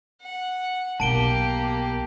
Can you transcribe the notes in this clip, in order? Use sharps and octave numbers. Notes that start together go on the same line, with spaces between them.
F#5
B1 A#3 B3 G4 A5 D7 G7